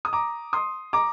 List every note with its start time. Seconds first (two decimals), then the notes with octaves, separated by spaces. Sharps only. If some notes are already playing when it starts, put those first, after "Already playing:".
0.05 D#6
0.13 A#5 D6
0.53 C6 D#6
0.93 A#5 D6